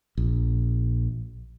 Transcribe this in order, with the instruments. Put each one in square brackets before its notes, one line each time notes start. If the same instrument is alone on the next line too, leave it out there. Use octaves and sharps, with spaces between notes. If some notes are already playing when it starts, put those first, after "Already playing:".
[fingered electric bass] A#1